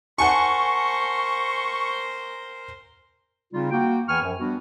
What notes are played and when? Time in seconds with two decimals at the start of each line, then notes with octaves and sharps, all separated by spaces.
0.18 A#4 C5 F#5 G#5 A5 C#6
3.52 C#3 G3 C4 D#4 F4
3.70 A#3 F#4 G5
4.08 E2 E3 G5 G#5 C#6 F6
4.22 F#2 F3
4.39 G3 B3 D4 F#4